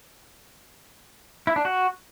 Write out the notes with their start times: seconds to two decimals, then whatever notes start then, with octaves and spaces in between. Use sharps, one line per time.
1.47 E4
1.56 D4
1.65 F#4